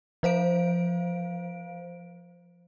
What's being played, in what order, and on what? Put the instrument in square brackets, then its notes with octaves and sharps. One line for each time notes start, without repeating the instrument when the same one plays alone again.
[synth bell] F3 C5 F5 D7